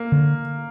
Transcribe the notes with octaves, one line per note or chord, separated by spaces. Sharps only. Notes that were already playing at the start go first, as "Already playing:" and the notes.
Already playing: A#3
D3